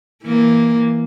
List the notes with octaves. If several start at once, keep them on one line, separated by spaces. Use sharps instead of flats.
E3 A#3